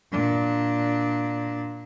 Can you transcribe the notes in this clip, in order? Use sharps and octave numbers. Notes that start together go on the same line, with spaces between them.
A#2 D4